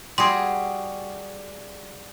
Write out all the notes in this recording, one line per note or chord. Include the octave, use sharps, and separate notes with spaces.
G3 F#4 G#4 C6